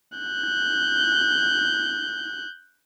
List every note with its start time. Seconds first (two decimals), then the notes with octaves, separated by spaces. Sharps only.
0.18 F#6 G6